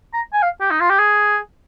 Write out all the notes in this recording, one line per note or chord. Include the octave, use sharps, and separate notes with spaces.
A#5
G#5
F5
G4
D#4
F4
G4
G#4